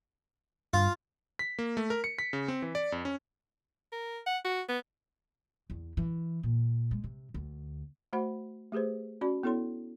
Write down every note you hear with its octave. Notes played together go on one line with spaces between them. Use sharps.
G2 F4
B6
A#3
A3
A#4
C#7
B6
C#3
C4
E3
D5
F2
C#4
A#4
F#5
F#4
B3
E2
E3
A#2
G#3
C3
D2
A3 F#4 C5 F#5 B5
A3 G4 G#4 B4 C5
C#4 F#4 D5 B5
B3 E4 A4 C#5 C6